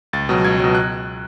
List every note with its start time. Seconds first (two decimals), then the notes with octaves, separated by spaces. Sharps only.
0.13 C#2 A6
0.29 B2 F#3
0.45 C#2 G#6
0.60 B2 F#3
0.75 F#6